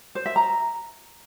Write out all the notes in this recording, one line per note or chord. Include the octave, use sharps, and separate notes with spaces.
C5
E5
A#5